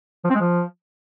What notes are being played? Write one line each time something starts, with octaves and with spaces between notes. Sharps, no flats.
F3
C4
G#3
F3